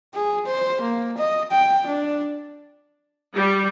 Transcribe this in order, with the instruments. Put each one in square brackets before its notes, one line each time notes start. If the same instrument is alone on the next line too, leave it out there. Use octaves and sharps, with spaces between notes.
[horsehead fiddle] G#4
C5
A#3
D#5
G5
D4
[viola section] G3